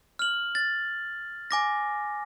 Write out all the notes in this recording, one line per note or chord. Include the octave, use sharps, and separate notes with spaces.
F6 F#7
A6
G#5 D6 A#6